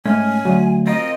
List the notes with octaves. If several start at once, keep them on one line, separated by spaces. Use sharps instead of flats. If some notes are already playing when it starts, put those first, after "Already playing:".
G#2 A3 C#4 G#5 F6
D2 F#3
C4 F4 A#4 D#5